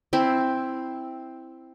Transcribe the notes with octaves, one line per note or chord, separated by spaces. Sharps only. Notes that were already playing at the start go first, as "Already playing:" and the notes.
C4 E4